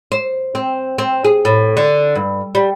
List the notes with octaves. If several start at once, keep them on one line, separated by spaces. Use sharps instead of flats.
C5
C4
C4
G#4
A2
D3
G2
G3